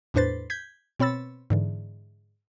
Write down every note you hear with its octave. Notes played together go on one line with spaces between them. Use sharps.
E2 A2 D4 B4 C5 A6
G6 G#6 B6
B2 C4 C#5 B5 E6 A6
G#2 D3 E3